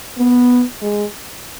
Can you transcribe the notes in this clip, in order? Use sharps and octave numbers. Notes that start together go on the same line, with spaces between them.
B3
G#3